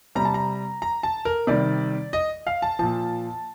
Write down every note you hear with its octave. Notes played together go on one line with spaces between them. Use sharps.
C3 G3 A#5
A5
A#5
A#5
A5
A#4
C3 D#3 G3 D5
D#5
F5
A5
A#2 F3 A5